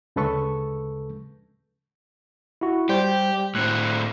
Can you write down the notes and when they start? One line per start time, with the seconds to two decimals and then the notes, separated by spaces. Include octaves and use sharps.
0.16 D2 C#3 G#3 A4 B4 C#6
2.61 E4 F#4
2.89 G3 G4 C5
3.55 A2 C4 F#6